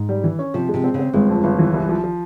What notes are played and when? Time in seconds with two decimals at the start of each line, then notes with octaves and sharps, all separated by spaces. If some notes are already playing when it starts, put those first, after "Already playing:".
Already playing: G#2
0.09 G3
0.24 E3
0.39 C#4
0.54 C3 F3
0.69 G#3
0.74 C3
0.84 C4
0.94 C#3
0.99 C4
1.13 G1 G#3
1.29 F2
1.44 G1
1.59 E3
1.74 C2
1.89 F3
2.04 F3